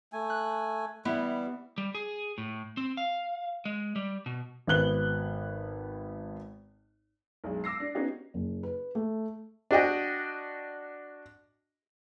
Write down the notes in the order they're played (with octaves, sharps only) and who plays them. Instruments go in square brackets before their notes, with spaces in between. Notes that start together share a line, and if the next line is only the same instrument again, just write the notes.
[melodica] A3 G#5
[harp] F#6
[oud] E3 E4 [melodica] G3 [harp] B3
[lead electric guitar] G3
G#4
A2
C4
F5
G#3
G3
B2
[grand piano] G#1 B3 F#6 G7
[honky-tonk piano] B1 G#3
D6 E6 A#6 C7
D4
B3 C#4 D#4 F#4 G4
[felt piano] F#1
B4
A3
[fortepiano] D4 F#4 D#5 G5